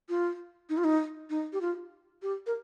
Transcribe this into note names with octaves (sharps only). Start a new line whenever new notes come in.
F4
D#4
F4
D#4
D#4
G4
F4
G4
A#4